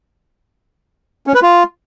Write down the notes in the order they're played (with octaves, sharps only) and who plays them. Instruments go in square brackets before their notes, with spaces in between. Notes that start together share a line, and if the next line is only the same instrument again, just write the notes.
[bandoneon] C#4
B4
F4